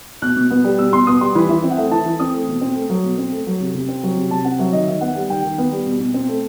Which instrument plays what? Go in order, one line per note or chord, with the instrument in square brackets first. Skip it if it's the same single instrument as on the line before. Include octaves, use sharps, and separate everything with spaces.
[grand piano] B2 F#6
B2
B3
G3
B2 E6
B2 C6
B3 D#6
G3 C6
E3 B5
E3 E5
C4
F#5
A3 E5
E3 A5
E3
C4 D#6
A3
B2
C4
A3
F#3
B2
C4
A3
F#3
C3
C3
C4
F#3
C3
C3 A5
C4 F#5
F#3 E5
D#3 D#5
D#3 E5
B3 F#5
G3
D#3 G5
D#3
B3
G3
B2
B2
C4
A3